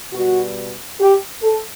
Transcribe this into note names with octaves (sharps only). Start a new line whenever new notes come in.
B2 G3 F#4
G4
A4